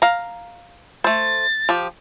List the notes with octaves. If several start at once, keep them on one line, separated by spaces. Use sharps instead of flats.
F5 A#5
A3 C5 A6
F3 G4